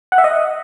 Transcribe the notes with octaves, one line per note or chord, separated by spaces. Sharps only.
F#5
E5
D#5